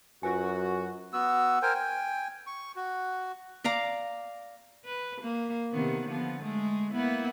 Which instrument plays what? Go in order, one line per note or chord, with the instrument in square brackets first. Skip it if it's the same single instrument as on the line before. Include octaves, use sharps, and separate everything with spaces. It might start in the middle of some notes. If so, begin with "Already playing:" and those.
[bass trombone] F#2 [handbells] F4 B4 G#5 [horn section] F#4
[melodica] B3 F#4 E6
A#4 C5 G5 G#5
G5 G#5
C#6
F#4
[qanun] D5 F5 A#5 D6
[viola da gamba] B4
A#3
C3 D#3 B3
D3 F3 B3
G#3 A3
A#3 B3 E4